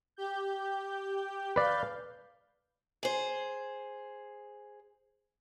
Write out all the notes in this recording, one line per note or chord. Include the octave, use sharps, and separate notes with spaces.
G4 G6
B4 D5 F5 G6
G#4 C5